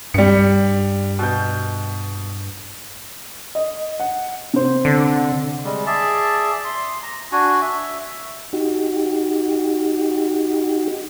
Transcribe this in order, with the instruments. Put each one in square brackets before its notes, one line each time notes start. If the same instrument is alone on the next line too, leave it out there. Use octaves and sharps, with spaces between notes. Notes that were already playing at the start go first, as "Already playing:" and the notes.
[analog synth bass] G2 [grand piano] G3 C#7
[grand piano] B2 G6
[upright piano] D#5
F#5
C3 C5
[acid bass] D3
[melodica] G3 G#3
G#4 D5 E5 A5
C6
A#5
D4 F#4 G#5
E5
[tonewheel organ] D#4 F#4 G4